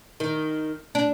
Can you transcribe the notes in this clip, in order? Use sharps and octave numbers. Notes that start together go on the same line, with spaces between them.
D#3
D4